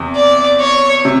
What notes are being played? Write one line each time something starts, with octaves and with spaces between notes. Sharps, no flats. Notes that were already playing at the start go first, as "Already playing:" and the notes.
Already playing: E2 C3
D5
C#5
C3